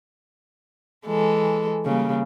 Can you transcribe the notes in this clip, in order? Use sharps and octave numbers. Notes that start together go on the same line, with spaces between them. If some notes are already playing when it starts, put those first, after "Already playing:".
E3 G#3 A4
C#3 G3 A#3